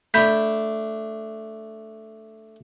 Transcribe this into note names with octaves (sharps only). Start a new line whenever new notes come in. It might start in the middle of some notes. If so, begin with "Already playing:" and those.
A3 D4 B5 G6 B6